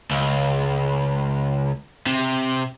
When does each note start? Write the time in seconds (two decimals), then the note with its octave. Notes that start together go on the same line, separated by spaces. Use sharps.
0.11 C#2
2.07 C3